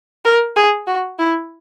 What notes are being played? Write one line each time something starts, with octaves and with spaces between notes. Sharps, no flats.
A#4
G#4
F#4
E4